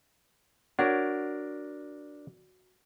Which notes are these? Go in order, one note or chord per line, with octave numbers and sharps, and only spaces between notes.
D4 F#4 A#4 C#5 F#5